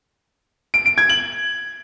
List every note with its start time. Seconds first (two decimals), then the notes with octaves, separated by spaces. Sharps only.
0.74 D7
0.86 D7
0.98 G#6
1.10 F#7